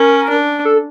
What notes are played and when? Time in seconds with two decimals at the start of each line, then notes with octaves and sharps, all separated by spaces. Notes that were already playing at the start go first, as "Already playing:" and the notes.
Already playing: C#4 A#4
0.30 D4
0.65 A4